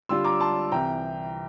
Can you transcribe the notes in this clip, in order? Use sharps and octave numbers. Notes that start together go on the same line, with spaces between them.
D3 G3 D4 F4 C6 E6
A#5 D6
A5 C6
C2 C3 E3 G5 A#5